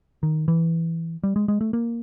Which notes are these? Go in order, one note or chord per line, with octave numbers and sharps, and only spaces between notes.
D#3
E3
G3
G#3
G#3
A3
A#3